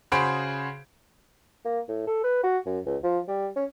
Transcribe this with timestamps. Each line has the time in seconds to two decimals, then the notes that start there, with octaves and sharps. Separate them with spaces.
0.12 C#3 F#4 G#4 C5 B5 D7
1.65 A#3
1.89 A2
2.07 A4
2.23 B4
2.44 F#4
2.66 F#2
2.86 C#2
3.03 F3
3.28 G3
3.56 C#4